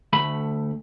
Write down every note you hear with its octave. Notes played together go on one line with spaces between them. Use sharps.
D2 A3 B5